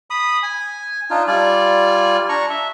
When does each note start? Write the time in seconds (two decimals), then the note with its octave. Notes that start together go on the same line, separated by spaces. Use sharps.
0.10 B5 D#6
0.43 G#5
1.10 D4 D#4 F4
1.28 G3 F4 D5 G#5
2.29 D4 A#5 C#6
2.50 E5